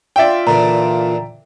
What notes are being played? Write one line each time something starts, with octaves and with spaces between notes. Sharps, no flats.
F4 D5 E5 G5
A#2 D3 E3 A#5